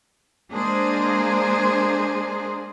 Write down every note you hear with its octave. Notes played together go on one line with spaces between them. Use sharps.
G#3 A#3 D4 G#4 C5